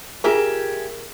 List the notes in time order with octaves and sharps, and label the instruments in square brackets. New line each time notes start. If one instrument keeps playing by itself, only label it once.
[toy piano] F4 G#4 [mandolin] G4 E5 G#5 [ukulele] A#4